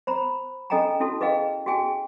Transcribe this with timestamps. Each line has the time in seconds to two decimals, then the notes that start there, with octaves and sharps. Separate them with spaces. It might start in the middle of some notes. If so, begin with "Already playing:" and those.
0.07 C5 A#5 B5
0.70 C#4 A4 D#5 G5 G#5 A#5
1.00 C#4 E4 F#4 A4 A5
1.21 G#4 B4 D#5 F5 G5
1.66 F#4 G#4 G5 G#5